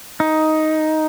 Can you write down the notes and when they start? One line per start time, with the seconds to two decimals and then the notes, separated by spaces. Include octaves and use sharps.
0.20 D#4